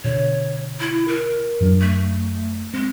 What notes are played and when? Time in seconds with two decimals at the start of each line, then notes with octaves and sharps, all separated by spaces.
0.04 B2 D3 C#5
0.80 E4
1.08 A#4
1.60 F#2 F#3 D4
1.81 A3
2.74 G#3 C4